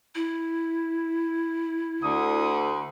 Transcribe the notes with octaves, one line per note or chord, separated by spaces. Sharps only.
E4
D2 D3 D#6